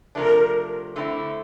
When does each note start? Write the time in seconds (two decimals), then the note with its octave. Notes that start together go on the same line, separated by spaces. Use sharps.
0.15 C3 F3 A3 D4 A#4
0.96 D3 A3 C4 E4